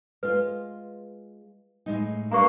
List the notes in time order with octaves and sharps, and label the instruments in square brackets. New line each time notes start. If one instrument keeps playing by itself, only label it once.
[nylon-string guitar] G#3 F4 [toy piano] B4
[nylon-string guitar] A2 G#3 D#4
[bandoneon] G2 A#3 [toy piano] A#5 C#6